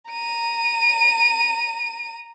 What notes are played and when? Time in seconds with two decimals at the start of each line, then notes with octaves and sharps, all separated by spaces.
0.10 A#5 D#7